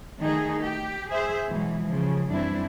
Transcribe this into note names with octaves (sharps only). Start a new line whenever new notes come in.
D#3 A3 D#4 G#4
G4
G#4 C5 E5
B2 E3 F#3 G#3
C#3 F3
F#2 E3 G3 C4 D4 E4